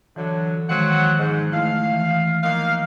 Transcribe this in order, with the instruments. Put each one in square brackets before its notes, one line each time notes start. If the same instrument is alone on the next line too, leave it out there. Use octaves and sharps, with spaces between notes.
[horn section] D3 F#3 [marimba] E3
[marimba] D#3 F3 G#3 [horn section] F#3 C4 F#5
[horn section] G#2
[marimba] A3 E4 [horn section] F5
[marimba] E3
[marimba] F3 F#6 [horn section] A#3 D#4 F5